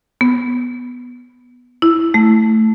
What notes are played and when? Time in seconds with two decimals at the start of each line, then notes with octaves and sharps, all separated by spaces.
0.21 B3
1.82 E4
2.14 A3